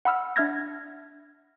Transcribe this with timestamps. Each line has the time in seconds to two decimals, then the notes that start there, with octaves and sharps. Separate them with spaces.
0.05 F#5 B5 E6 F6
0.36 D4 E5 F6 G#6 A#6